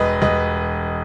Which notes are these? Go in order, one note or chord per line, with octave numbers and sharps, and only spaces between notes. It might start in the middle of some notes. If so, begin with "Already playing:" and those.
Already playing: E1 B4 D#5
E1 B4 D#5